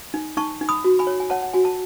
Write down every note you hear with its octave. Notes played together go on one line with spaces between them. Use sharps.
D#4
D#4 A5 C#6
D#4
B5 D#6
F#4
G#5 B5
C#5
G#5
C#5 F#5 A5
F#5
F#4 G#5
A5